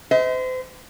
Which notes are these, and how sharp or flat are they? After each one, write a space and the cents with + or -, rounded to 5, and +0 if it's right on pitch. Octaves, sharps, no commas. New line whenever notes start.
C5 -35 D#5 +45